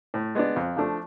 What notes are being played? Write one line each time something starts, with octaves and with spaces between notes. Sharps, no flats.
A2
G#3 B3 D4
F2
F3 A3 D4